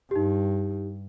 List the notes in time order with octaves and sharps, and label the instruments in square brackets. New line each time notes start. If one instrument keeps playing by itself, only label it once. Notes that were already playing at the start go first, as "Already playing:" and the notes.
[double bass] G2 [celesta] D#4 G4